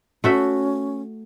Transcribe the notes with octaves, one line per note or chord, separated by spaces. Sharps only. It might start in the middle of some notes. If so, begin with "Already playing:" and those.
A3 C#4 F#4 E5